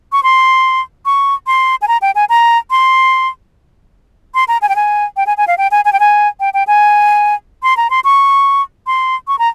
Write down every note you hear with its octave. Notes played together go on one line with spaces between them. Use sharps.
C#6
C6
C#6
C6
G#5
A#5
G5
G#5
A#5
C6
C6
A#5
G#5
G5
G#5
G5
G#5
G#5
F5
G5
G#5
G#5
G5
G#5
G5
G5
G#5
C6
A#5
C6
C#6
C6
C#6
A#5